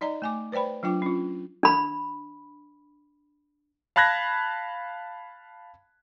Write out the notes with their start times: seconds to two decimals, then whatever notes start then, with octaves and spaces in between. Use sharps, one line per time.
0.01 D#4 D5 D#5 A#5
0.22 A3 G#5 D6
0.52 B4 C5 D5 G5 B5
0.83 F#3 D4 F4 G5 D6
1.02 C#4 F4
1.63 D4 B5
3.96 F5 A5 B5 F#6 G#6 A#6